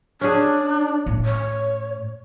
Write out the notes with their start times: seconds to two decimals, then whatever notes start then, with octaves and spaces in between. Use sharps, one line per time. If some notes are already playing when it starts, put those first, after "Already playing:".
0.21 C#4 D4 G#4
1.06 A2
1.25 C#5